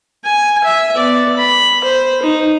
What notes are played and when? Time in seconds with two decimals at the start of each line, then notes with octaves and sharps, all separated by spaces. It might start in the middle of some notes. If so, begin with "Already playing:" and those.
0.25 G#5
0.64 E5
0.96 B3 D5
1.37 B5
1.84 C5
2.23 D#4